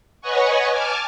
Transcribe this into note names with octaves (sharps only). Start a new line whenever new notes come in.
B4 C#5 D#5 F#5 G#5 C#6
G#5 A5 D6 F6